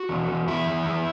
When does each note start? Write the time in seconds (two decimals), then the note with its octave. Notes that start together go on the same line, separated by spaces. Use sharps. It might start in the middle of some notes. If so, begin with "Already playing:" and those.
Already playing: F#4
0.09 E2
0.28 E2
0.48 E2 E4
0.67 E2
0.86 E2